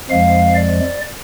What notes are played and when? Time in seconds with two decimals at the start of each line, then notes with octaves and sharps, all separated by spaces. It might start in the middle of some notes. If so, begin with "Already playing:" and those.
0.10 F2 F3 G#3 F5
0.55 D5